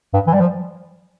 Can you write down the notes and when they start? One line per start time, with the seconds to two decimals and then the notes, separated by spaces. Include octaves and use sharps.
0.14 G2
0.27 E3
0.33 G3
0.41 F3